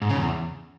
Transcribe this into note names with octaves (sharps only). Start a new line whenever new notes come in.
G#2
C#3
E2